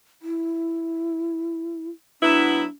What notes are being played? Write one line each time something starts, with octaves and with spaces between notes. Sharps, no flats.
E4
F#3 B3 D4 E4